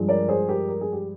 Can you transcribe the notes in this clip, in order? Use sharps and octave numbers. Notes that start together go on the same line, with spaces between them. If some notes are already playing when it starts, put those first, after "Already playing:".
Already playing: G2 F3 G#3
A#4 D5
G#4 C5
G4 A#4
A#4
G#4
G4